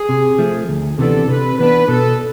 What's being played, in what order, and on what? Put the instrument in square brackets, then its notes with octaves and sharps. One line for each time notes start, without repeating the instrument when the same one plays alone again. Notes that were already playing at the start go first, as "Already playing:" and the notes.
Already playing: [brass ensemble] G#4
[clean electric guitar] C3
F3 A3
D2
[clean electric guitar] C3 E3 B3 D4 [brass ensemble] A4
[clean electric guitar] C3 [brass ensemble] B4
[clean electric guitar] E3 B3 D4 [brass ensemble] B4
[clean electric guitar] B2 [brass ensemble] A4